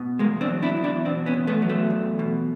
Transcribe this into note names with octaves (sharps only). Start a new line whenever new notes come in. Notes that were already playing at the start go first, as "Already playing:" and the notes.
Already playing: B2
E2 G#3 A#3
C4 D4
F#3
D4 E4
E2
D4 E4
B2 C4 D4
B3 C#4
E2
A3 B3
F#3
A3
E2
B2